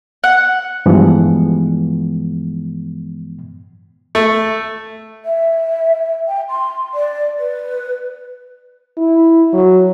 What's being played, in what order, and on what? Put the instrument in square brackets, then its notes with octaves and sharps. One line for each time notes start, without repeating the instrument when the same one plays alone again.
[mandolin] F#5
[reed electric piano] G2 E3 F3 G#3 B3
[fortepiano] A3
[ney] E5
G5
C6
D5
B4
[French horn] E4
F#3